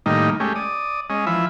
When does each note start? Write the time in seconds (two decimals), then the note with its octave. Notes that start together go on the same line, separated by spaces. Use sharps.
0.06 A2 D#3 G3 A#3 D#4
0.40 G#3 A3 C#4 G4
0.55 D5 D#6
1.10 G#3 C#4 D#5
1.26 E3 F3 E5 B5